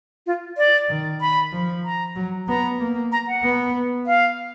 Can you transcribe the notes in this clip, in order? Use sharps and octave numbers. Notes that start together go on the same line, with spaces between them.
F4
D5
D#3
B5
F3
A#5
F#3
B3 A#5
A#3
A#5
F#5
B3
F5